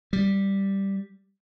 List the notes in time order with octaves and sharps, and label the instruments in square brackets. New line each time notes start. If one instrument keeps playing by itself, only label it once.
[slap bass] G3